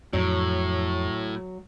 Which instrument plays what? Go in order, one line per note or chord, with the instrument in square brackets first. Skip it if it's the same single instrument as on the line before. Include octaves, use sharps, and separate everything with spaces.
[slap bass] F2 [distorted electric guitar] A2 [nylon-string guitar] F#3